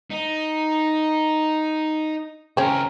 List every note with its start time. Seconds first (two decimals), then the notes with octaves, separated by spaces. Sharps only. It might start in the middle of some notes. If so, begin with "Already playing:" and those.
0.10 D#4
2.57 C#2 C4 C#4 A#4